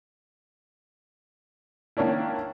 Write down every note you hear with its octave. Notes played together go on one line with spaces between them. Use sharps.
D#3 A#3 C#4 D4 E4